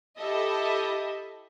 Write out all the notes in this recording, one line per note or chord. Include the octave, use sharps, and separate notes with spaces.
E4 G4 A4 D#5 E5